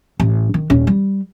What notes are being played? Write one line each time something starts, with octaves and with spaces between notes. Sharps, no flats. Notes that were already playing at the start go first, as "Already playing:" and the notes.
A1
D#3
D#1 C#4
G3